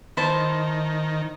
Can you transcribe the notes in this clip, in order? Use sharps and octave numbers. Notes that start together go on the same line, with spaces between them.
D#3 E4 C5 A5